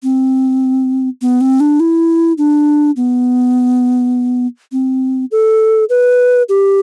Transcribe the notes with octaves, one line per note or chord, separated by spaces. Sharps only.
C4
B3
C4
D4
E4
D4
B3
C4
A4
B4
G4